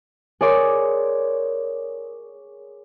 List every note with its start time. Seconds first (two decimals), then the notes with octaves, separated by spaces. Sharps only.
0.41 G#4 A#4 C#5 D5 C6